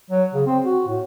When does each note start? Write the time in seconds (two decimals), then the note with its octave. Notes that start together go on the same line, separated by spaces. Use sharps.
0.10 F#3
0.34 C#3
0.46 C4
0.65 F#4
0.88 A2